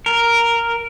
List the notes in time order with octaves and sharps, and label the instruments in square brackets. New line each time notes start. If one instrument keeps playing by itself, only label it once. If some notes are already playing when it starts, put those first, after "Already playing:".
[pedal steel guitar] A#4